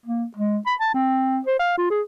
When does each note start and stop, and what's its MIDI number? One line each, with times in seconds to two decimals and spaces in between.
0.06 0.24 58
0.37 0.57 56
0.66 0.75 83
0.80 0.91 81
0.94 1.40 60
1.47 1.58 72
1.59 1.75 77
1.78 1.90 65
1.91 2.02 68